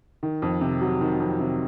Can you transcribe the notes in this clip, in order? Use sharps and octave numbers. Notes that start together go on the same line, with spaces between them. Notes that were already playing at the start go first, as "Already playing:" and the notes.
D#3
F2
C3
F#3
D#3
F2
C3